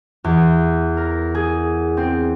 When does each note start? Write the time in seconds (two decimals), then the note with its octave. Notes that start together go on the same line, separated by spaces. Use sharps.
0.24 E2
0.97 A#4
1.35 G#4
1.97 C4